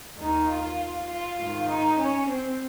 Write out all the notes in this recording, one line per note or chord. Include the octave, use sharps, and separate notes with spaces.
D#2 D#3 D#4
F4
F4
G#2 D#3 F4
D#4
C#4
C4